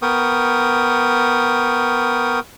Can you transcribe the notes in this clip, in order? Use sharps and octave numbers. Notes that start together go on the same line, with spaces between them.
B3 A#4 G5 C#6 D#6